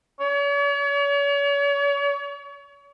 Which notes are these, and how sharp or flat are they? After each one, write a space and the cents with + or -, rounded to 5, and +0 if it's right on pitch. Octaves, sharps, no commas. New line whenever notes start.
C#5 +40